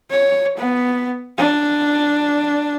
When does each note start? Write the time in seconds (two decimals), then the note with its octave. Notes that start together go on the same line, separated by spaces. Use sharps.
0.10 C#5
0.57 B3
1.38 D4